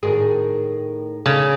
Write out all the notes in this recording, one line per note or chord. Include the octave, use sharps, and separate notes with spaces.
A2 D#3 G#4
C#3 A3 D#4